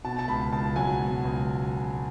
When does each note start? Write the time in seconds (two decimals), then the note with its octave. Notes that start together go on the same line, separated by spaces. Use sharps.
0.04 B2 A5
0.19 A5
0.28 C#2 B5
0.52 C#2 A5
0.76 F#3 G#5
1.01 B2
1.25 C#2